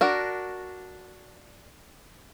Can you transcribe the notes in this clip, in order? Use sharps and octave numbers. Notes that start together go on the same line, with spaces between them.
D4 F#4 A#4